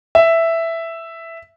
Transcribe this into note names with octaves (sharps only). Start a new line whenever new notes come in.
E5